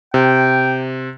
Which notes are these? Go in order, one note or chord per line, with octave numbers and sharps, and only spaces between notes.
C3 G5